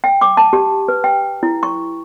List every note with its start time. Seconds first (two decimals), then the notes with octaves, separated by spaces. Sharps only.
0.04 G5
0.21 D6
0.37 A5
0.53 G4
0.88 B4
1.04 G5
1.43 E4
1.63 C#6